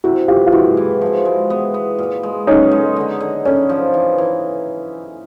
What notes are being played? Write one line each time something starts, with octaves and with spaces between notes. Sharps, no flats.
C3 E4 F#4
E3 F4 G4
F4
G#3 E4 F#4
E3
F3
G#3
B3
B3
A#2
G#3
B3 C#4 D#4
G#3
D3
D3
D3 C#4
F3
E3
E3